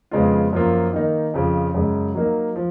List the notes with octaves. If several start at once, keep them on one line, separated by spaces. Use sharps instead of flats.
F2 C#3 G#3 B3 F4
F#2 F3 A#3 F4
D#3 A#3 D#4 A#4
F2 C#3 F3
F#2 C#3 G#3
F#3 A#3 D#4 A#4
F3